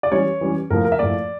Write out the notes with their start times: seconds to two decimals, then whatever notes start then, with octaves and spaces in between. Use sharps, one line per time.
0.03 D5
0.11 E3 G3 C#4 C#5
0.41 E3 G3 C#4
0.70 A2 F3 A#3 A#4
0.85 A#4
0.92 E5
0.99 A2 F3 A#3 D5